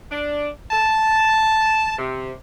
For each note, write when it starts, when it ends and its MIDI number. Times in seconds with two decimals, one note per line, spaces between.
0.11 0.49 62
0.71 1.96 81
1.99 2.32 48